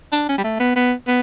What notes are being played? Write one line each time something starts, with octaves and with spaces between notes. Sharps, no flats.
D4
C#4
G3
A3
B3
B3
B3